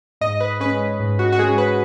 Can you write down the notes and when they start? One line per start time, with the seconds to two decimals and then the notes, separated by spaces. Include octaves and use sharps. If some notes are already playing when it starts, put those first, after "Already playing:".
0.21 G#2 D#5
0.40 B4
0.60 G#3 C#4 B4
1.00 G#2
1.19 F#4
1.32 F#4
1.39 G#3 C#4 G#4
1.58 B4